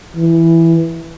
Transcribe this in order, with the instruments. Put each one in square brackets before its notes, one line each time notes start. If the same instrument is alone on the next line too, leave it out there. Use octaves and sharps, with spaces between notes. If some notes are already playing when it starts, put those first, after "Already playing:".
[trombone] E3